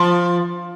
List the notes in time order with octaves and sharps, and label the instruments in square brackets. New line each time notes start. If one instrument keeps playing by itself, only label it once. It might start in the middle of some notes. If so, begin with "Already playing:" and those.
Already playing: [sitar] F3